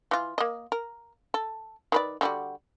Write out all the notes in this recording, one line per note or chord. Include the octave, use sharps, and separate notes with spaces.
E3 F4
A#3 D#5
A#4
A4
D#3 B4 D5
D3 G3 F#4